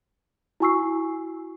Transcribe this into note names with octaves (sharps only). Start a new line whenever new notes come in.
E4 F#4 G#5 C#6 E6 C7